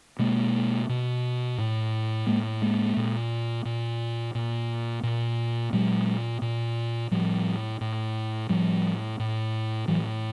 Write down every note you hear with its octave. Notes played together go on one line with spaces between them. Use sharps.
B2 G#3 A#3
B2
A2
A2 G#3 A#3
G#3 A#3
A#2
A#2
A#2
A#2
A#2 F#3 G#3
A#2
A2 F3 G3
A2
A2 F3 G3
A2
A2 E3 F#3